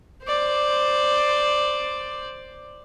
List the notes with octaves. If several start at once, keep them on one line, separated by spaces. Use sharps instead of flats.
C5 D5